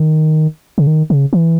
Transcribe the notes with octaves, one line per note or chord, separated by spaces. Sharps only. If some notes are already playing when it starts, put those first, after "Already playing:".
Already playing: D#3
C#3
D#3
C#3
E3